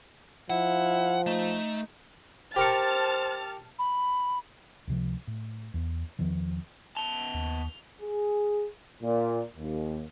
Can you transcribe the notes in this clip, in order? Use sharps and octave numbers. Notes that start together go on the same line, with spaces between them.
F3 E4 F#5
A3 D#4
G4 A#4 C5 A5 C#6 F6 A6
B5
C#2 C3 F3
A2
E2
E2 D#3 F3
B3 A5 F7 G7
D#2
G#4
A#2
D#2